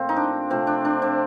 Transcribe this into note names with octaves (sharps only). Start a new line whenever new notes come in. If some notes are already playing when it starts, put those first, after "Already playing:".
Already playing: A#2 F3 A3 C4 F4
D#4
D4
C3 F3 A3 C4
D4
D4
C4